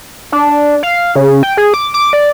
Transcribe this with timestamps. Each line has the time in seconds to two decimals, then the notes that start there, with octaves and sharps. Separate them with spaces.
0.32 D4
0.83 F5
1.16 C#3
1.43 G5
1.57 G#4
1.74 D6
1.94 D6
2.13 D5